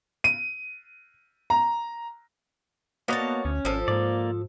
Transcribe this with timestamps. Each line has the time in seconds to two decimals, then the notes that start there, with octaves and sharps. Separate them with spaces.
0.24 D#7
1.50 A#5
3.08 A#3 B3 F#4 C#5 D#5 A5
3.45 D2 C#4
3.65 G#1 F3 A4
3.88 G#2 A#3 D5